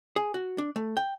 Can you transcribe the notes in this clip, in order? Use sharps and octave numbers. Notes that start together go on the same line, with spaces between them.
G#4
F#4
D4
A3
G5